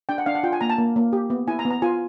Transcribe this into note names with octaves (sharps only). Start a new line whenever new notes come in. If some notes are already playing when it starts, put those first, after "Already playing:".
D4 G5
F#5
D4 F5
F#5
F4 G5
G#5
A#3 A#5
A5
A#3
A#3
G4
B3
E4 G#5
A#5
B3
A#5
F4 G#5